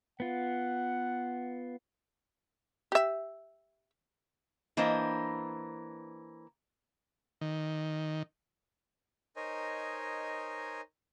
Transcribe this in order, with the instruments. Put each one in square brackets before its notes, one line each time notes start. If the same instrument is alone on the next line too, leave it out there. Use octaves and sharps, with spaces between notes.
[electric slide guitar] B3 F4 [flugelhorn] F#5
[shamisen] G4 E5
[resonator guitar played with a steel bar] E3 A#3 D4 C5 D#5
[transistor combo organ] D#3
[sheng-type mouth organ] D#4 A#4 C5 C#5 D#5 G#5